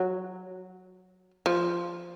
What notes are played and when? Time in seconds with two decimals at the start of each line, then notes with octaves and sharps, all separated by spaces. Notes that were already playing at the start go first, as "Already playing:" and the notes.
Already playing: F#3
1.46 F3